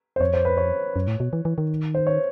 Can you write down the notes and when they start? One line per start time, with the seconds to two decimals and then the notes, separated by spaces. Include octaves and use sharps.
0.16 C5
0.20 F2 C#5
0.33 C5
0.45 B4
0.57 C#5
0.96 F#2
1.07 A2
1.20 B2
1.33 E3
1.45 E3
1.58 D#3
1.94 C5
2.07 C#5